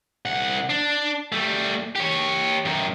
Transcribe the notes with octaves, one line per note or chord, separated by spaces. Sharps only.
C2 F#5
D4
G3 A3
G4 C#5
F#2 D#3